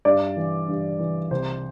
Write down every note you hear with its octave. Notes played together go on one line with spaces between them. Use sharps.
G2 D5
E3
G2
E3
C2 C5